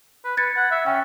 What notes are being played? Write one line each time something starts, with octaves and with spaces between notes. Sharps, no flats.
B4
B4 G#6 A6 C#7
F#5
E5
C#4 G5